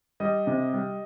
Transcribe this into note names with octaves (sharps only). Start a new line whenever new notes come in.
G3 D#5
C3
G3